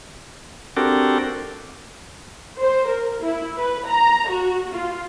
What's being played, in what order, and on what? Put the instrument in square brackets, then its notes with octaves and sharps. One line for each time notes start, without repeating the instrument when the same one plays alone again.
[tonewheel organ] C4 D4 F#4 G4 A4 A#4
[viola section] C5
A#4
E4
B4
A#5
F#4
F4